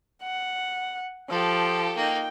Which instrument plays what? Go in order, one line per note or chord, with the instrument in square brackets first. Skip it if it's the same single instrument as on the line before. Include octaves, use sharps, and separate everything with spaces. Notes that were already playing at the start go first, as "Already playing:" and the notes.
[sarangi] F#5
[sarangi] F3 [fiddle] G4 A4
[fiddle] A#3 D#4 [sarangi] G5